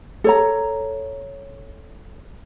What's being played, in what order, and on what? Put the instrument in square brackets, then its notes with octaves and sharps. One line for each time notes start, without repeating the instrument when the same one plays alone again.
[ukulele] A4 C#5 A#5